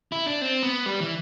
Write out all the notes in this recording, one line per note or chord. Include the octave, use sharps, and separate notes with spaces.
E4
D4
C4
B3
G3
E3